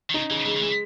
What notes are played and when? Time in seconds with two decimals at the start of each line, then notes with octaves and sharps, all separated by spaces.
0.10 D#3
0.14 C#3 D#4
0.30 C#3 E3
0.46 E3 G#3
0.56 D#3
0.61 E3 G#3